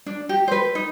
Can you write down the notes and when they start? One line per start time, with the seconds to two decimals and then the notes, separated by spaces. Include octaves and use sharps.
0.06 D4
0.29 G4
0.48 B4 C5
0.75 D#4